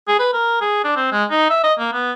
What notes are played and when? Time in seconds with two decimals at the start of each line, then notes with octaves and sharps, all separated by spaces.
0.08 G#4
0.20 B4
0.33 A#4
0.61 G#4
0.85 D4
0.97 C4
1.12 G#3
1.31 D#4
1.50 E5
1.64 D#5
1.79 A#3
1.93 B3